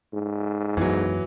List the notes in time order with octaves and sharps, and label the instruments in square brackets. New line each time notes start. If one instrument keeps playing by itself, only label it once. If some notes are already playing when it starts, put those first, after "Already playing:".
[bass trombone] G#2
[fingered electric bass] F#2 B3 [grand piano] E3 F#3